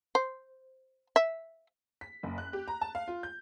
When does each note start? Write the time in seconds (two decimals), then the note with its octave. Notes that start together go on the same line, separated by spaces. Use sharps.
0.15 C5
1.16 E5
2.01 B6
2.23 F#1
2.38 F#6
2.53 G4
2.68 A#5
2.81 A5
2.95 F5
3.08 F4
3.23 G6